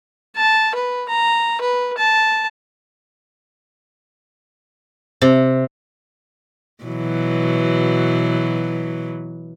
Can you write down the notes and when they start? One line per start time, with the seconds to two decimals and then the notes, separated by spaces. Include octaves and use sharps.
0.36 A5
0.74 B4
1.09 A#5
1.61 B4
1.98 A5
5.22 C3
6.84 B2 E3 F#3